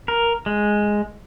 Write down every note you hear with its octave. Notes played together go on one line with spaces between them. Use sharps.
A#4
G#3